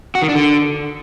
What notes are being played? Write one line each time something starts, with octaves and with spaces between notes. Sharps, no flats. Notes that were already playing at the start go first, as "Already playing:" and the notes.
F#4
D#3
D4
D3